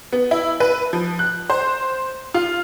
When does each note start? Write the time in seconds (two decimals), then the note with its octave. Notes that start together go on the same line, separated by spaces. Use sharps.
0.12 B3
0.31 E4
0.60 B4
0.93 F3
1.19 F#6
1.50 C5
2.34 F4